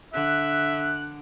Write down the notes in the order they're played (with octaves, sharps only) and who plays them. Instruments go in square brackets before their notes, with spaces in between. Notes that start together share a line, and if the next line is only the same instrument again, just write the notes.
[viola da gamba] D3 [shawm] E5 [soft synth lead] F#6